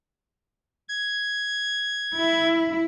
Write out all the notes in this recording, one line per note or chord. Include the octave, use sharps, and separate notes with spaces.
G#6
E4